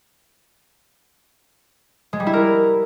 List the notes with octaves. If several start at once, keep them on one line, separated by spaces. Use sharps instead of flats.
G#3
G3
E4
A#4